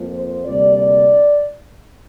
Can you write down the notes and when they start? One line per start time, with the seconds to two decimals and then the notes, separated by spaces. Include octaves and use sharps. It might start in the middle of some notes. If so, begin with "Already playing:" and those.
Already playing: F2 F3 A#3
0.14 C5
0.45 D2 C3 G3 A#3 D5
0.77 D5